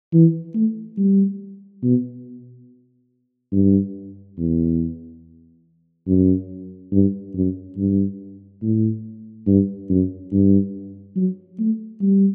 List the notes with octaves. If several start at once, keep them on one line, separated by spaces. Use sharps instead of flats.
E3
A3
G3
B2
G2
E2
F#2
G2
F#2
G2
A2
G2
F#2
G2
F#3
A3
G3